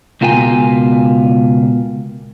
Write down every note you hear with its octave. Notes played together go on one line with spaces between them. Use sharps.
C#2 B2 F4 A#4 G5 G#5